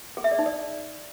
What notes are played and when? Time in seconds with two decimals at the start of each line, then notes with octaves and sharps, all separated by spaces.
0.17 G#4
0.24 E5
0.31 D5
0.39 D#4
0.46 D5